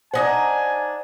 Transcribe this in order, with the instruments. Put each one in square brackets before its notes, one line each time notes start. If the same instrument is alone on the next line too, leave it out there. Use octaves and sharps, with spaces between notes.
[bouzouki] D4 D#4 F#5 [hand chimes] C5 [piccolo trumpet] G#5